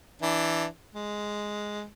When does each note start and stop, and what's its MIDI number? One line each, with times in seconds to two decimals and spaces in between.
0.22 0.66 52
0.22 0.66 62
0.95 1.84 56